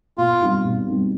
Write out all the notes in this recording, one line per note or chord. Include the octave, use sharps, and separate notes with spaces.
B2 F4
G3 C4 D#4
B2
G3 C4 D#4